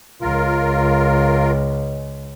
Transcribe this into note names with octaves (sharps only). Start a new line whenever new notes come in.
C#2 F4 A#4